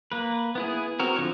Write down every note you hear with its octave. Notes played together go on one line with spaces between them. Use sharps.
A#3 B4
B3 E4 G#4
C4 F#4 A#4
D3 F3 C#5